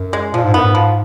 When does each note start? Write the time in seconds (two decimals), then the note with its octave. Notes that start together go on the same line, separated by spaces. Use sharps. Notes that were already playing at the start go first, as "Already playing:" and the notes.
Already playing: F#2
0.13 G#3
0.34 A#2 F3
0.44 G#2
0.54 F#2 B3
0.64 G#2
0.75 F3